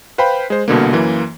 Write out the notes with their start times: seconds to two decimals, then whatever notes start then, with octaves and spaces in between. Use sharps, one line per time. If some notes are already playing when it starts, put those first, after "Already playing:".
0.18 B4 C5 F5 G5 B5
0.50 G#3 C5
0.68 C2 B2 D3 A#3
0.93 F#2 E3 A#3